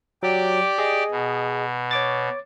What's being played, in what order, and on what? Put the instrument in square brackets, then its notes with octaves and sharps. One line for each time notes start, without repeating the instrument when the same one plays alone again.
[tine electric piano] F#3 [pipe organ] G4 D5
[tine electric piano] G#4 D#5
[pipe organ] B2
[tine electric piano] C#5 D6 A6